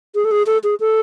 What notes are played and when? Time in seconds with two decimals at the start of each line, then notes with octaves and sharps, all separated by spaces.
0.15 G#4
0.25 A4
0.31 G#4
0.46 A4
0.64 G#4
0.80 A4